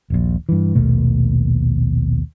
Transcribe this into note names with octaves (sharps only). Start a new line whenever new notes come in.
D#1 A#1
G2 E3
A#1 D#2 B2 A3